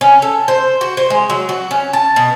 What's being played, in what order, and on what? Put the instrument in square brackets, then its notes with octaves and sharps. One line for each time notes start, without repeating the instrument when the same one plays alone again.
[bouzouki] C#4
A4
C5
F#4
C5
G#3
F#3
F#4
C#4
A5
B2